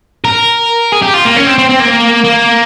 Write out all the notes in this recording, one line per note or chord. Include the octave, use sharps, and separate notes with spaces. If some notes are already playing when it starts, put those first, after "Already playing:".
A#4
G#4
G4
F4
A#3
C#4
C4
C4
C4
A#3
A#3